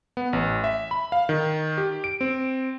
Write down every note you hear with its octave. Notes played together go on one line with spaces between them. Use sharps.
B3
A1
E5
B5
F5
D#3
G4
D7
C4